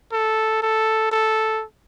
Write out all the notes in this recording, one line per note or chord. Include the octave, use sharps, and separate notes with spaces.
A4
A4
A4